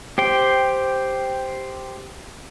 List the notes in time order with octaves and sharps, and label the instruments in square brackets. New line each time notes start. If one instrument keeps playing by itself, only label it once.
[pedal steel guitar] G4 C5 G5